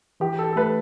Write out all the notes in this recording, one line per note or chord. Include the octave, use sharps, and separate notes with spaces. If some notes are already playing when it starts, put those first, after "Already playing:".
E3 G4
A4
A4
A3 B4